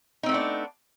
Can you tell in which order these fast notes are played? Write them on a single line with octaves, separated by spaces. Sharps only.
D#4 C4 A3 B3 D4